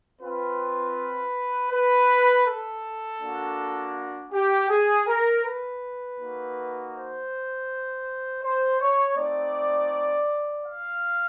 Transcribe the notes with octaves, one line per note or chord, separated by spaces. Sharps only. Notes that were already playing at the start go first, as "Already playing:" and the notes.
C4 F4 B4
B4
A4
A#3 D4 F#4
G4
G#4
A#4
B4
A#3 D#4 F#4
C5
C5
C#5
A3 C4 D#4 D5
F5